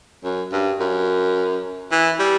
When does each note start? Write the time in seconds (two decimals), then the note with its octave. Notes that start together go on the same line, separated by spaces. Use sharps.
0.24 F#2
0.52 G2
0.80 F#2
1.92 E3
2.19 G3